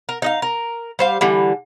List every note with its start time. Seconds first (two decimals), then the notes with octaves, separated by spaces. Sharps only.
0.09 A#4
0.22 D#4 D#5 F5
0.42 A#4
0.99 G3 C5 F5
1.21 D3 E3 G3